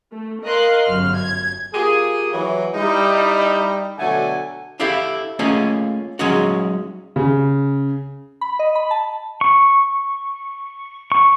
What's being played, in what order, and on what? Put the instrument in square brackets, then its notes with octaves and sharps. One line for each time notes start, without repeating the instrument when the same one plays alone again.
[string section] A3
A#4 D#5 F5 C6 F#6
G1 F#2 F6
G#6
[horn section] A#3 F4 G4 G#4
E3 F#3
G3 D#4 E4
B2 D3 F#3 A3 F#5 G#5
[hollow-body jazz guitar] D4 E4 G4 A4 F5 G5
A3 A#3 C#4 F4 G#4 D#5
F#3 G#3 C#4 D#4 F#4
[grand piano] C#3
[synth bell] B5
D#5
B5
A5
[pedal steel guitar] C#6
C#6